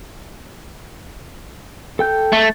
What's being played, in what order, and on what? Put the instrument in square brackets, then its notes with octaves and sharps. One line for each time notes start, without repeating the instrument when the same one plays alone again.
[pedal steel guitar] A4 G5 G6
[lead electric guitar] A3